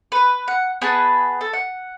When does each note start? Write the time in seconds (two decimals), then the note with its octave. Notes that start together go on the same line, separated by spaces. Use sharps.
0.12 B4
0.48 F#5
0.82 B3 G#4 B4 A5
1.41 A4
1.53 F#5